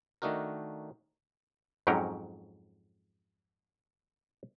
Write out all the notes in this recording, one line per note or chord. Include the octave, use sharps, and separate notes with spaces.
D#3 A3 D4 D#4 F#4 A#4
F2 G#2 F#3 C#4 G5 A#5